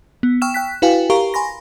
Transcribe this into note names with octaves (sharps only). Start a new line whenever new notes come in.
B3
G5 C#6 E6 F6 E7
G5 F#6 B6
E4 F#4 B4 F5 G5 G#5
G4 A#4 F5 A#5 C#6
G#5 B5 C6 A#6